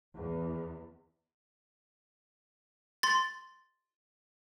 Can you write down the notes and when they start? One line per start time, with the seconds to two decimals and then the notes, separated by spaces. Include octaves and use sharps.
0.15 E2
3.03 C6 A6